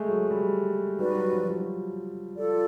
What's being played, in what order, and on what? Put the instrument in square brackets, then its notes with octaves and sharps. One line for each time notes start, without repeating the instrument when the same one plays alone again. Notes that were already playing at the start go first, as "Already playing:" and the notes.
Already playing: [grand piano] G#3 A3
F#3
G3
[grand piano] G3 [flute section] D#4 F#4 B4 D5
[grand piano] F#3
F3
F#3
[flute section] F4 A4 D5